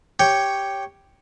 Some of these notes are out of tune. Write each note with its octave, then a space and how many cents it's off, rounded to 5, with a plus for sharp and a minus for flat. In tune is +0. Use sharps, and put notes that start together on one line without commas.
G4 +0 C#5 +0 G5 +0